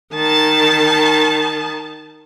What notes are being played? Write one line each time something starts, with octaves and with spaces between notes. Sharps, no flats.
D#3 A5